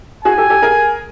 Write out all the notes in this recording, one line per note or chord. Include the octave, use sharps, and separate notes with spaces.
F#4 G#4 G#5
G4 A4
G4 A4
G#4 A#4